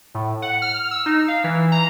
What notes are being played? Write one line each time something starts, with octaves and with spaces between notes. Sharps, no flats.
A2
F#5
F6
E6
D#4
F5
E3
A#5